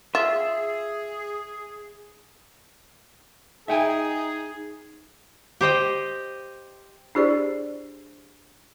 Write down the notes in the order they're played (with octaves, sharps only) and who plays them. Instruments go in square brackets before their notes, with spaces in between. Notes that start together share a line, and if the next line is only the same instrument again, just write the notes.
[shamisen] F4 [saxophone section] G#4 [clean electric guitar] E5
[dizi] D#4 [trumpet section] G#4 [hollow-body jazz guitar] E5 G5 G#5
[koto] G4 C5 D#5 G5
[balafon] D4 E4 G4 G#4 C5 D5